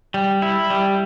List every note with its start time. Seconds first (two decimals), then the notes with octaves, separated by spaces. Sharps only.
0.14 G3
0.42 E4
0.70 G3